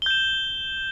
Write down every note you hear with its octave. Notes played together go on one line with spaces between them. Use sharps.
G6 E7 G7